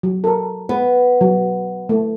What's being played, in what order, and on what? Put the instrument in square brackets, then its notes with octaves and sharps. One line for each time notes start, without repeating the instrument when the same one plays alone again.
[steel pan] F#3
A4 A#4
[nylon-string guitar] B3 [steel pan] B4
[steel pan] F#3
A3